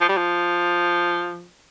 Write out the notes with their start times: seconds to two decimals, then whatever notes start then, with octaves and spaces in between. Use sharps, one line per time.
0.01 F3
0.09 G3
0.17 F3